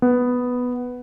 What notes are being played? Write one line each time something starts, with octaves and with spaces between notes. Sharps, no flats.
B3